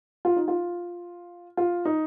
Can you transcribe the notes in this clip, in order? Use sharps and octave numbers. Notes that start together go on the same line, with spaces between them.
F4
D#4
F4
F4
D#4